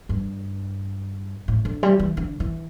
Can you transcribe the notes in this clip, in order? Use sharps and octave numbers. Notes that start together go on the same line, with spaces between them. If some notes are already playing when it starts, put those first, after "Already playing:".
G2
A2
D3
G3
E3
D3
E3